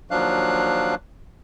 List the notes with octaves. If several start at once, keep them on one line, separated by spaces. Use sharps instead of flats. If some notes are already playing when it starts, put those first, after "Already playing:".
D#2 F3 F#3 D4 F5 F#6